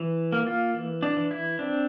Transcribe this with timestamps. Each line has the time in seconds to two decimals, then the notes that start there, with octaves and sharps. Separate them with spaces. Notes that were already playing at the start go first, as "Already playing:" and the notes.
Already playing: E3
0.32 A#3
0.47 F4
0.74 E3
1.03 D4
1.17 E3
1.31 E4
1.59 C4 D4